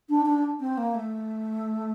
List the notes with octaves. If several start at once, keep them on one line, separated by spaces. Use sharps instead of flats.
D4
D4
C4
A#3
A3